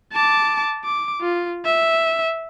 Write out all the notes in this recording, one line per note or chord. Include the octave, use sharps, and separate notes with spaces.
A5 D6
D6
F4
E5